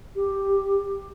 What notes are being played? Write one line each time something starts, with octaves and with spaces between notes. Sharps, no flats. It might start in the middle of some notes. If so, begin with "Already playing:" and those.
G4